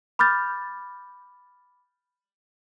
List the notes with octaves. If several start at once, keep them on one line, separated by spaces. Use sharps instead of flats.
B5 D6 F6 G6 A6